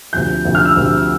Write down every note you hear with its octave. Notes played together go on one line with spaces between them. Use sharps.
D2 C3 F3 G6
D2 C3 F3
F6
E6
D2 C3 F3